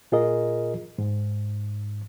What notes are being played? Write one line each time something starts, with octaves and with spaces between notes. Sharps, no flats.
A#2 F4 G#4 A#4 D#5
G#2